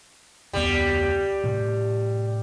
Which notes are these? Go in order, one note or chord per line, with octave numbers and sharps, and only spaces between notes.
F1 D2 G3 B3
A2 C3